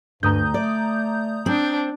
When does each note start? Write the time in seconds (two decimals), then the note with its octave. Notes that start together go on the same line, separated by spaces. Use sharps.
0.23 D2 G2 A#5 D#6 G6
0.54 A3 D5
1.46 C4 D4